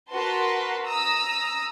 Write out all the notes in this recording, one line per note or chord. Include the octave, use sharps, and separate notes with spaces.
F#4 A#4 B4 A5 C6
A#5 D#6 E6